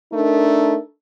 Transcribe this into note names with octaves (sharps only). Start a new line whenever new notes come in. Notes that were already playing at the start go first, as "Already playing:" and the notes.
A3 D4 D#4 A#4